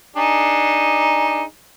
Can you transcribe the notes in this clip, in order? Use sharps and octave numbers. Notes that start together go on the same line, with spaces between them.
D4 D#4 G#4